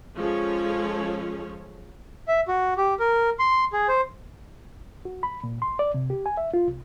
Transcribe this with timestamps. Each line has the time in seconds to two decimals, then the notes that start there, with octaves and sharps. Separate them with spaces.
0.17 F3 G#3 C#4 G#4 A4 C#5
2.28 E5
2.48 F#4
2.77 G4
2.99 A#4
3.39 C6
3.73 G#4
3.88 C5
5.05 F#4
5.23 B5
5.44 A#2
5.62 C6
5.79 D5
5.94 C3
6.10 G4
6.26 G#5
6.37 E5
6.54 F4
6.68 C2